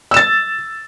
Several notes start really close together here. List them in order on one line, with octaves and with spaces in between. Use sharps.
E6 E7 A6